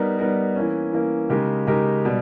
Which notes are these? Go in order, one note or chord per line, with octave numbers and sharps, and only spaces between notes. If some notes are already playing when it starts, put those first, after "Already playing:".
Already playing: G3 B3 D#4 A#4
G3 B3 D#4 A#4
E3 A#3 C#4
E3 A#3 C#4
C#3 G#3 D#4 G4 A#4
C#3 G#3 D#4 G4 A#4
B2 G3